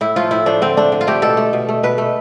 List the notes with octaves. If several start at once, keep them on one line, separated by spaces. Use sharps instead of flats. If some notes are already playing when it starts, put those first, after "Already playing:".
A2 E4
F3 A3 F4
A2 E4
F3 A3 D4
D3 C4
A3 D4
D3
F4
A3 G4
B2 A4
A3
B2
A3
B2 B4
A3